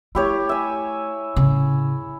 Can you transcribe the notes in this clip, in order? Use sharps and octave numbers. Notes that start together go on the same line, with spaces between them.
A3 E4 G4 C#5
E5 G#5
A2 C#3